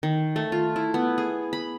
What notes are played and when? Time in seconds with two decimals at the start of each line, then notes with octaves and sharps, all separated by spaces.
0.03 D#3
0.36 A3
0.52 F4
0.76 E4
0.94 B3
1.18 G#4
1.53 B5